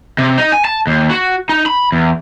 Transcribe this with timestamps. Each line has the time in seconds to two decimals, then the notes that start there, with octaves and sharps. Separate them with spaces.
0.18 C3
0.38 D#4
0.52 G#5
0.65 A5
0.87 D#2
1.10 F#4
1.49 D#4
1.66 B5
1.92 E2